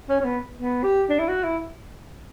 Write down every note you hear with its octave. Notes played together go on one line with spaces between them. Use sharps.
C#4
C#4
B3
B3
G4
D4
E4
F#4
E4